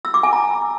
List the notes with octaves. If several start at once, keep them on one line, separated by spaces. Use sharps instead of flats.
E6
D6
G#5
A#5